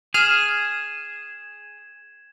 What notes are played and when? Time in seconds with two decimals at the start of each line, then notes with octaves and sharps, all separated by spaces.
0.14 G#4 F6 G#6 E7